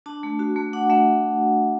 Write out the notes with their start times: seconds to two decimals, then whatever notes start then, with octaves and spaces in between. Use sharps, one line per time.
0.06 D4 A5
0.23 A3
0.39 F#4
0.56 A3
0.73 D4 F#5
0.90 A3 E5